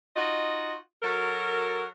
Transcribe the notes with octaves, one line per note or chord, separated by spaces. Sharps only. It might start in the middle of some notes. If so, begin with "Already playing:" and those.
D#4 F4 F#4 D#5
F#3 F#4 A4 A#4